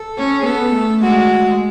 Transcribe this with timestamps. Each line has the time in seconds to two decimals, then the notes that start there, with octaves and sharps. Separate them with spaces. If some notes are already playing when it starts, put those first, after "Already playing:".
Already playing: A4
0.18 C#4
0.40 G#4
0.45 B3 A4
0.74 A3
1.03 G#3 F#4